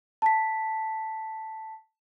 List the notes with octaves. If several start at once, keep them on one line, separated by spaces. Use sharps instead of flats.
A5 B6